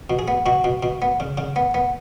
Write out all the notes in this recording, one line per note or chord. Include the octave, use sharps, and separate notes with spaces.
B2
G#4
B3
B2 F#4
B2
B2
B3
C#3
C#3
B3
B3